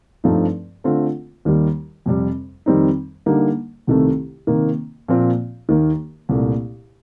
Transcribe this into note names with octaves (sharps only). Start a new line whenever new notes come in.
G2 F3 A3 C4 D#4
D3 A3 C4 F4
D#2 D#3 G3
F2 C3 G3
F2 D#3 G3 C4 D#4
D3 G3 A#3 D#4
C2 C3 D#3 A3
C3 D#3 A#3
A#2 F3 C4 F4
D#2 D#3 A#3 D#4
C2 A#2 A3